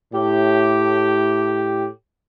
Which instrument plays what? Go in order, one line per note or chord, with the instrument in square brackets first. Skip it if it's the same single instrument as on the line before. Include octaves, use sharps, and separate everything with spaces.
[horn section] A2 G4